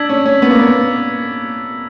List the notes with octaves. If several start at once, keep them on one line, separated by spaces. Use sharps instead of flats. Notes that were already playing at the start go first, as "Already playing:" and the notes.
Already playing: D4 E6 G#6 B6
C#4
C#4
B3
A#3
B3